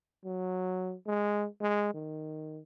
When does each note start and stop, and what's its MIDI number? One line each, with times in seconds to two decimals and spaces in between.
0.25 0.94 54
1.06 1.47 56
1.61 1.93 56
1.94 2.61 51